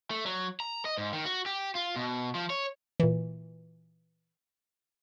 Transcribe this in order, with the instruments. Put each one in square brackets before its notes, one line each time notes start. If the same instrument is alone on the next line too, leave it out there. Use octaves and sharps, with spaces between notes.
[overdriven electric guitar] A3
F#3
A#5
D#5
G#2
D#3
F#4
G4
F4
B2
F3
C#5
[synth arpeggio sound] A#2 E3